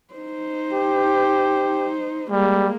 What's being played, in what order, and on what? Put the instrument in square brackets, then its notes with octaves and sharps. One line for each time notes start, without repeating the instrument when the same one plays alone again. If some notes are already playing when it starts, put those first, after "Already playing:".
[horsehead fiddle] D#4 C5
[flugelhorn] G4
[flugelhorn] G3 [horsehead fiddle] G#3 A#3